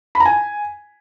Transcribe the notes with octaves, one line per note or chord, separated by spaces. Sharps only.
B5
A#5
G#5